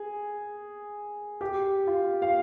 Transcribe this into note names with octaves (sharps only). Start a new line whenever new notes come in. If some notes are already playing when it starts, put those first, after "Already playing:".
Already playing: G#4
G4
F4
F5